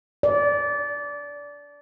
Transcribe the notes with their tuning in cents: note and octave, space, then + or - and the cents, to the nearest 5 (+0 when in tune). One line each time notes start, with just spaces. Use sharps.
D5 -20